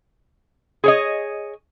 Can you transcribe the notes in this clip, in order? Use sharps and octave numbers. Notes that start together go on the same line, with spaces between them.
G#4 C#5 D#5